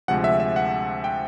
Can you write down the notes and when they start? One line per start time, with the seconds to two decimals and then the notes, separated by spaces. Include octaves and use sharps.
0.08 D2 C3 F3 G#3 F#5
0.24 E5
0.40 E5
0.56 F#5
1.04 G5